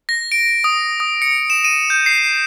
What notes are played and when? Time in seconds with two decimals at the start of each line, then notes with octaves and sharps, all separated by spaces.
0.09 A#6
0.32 D7
0.64 D#6
1.00 D#6
1.22 C#7
1.50 E7
1.64 D#7
1.90 G6
2.06 C7